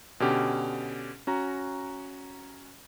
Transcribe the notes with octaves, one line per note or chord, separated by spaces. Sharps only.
B2 D3 C#4 G4
C#4 F#4 A#5